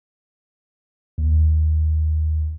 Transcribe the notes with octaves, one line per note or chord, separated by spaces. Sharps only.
D#2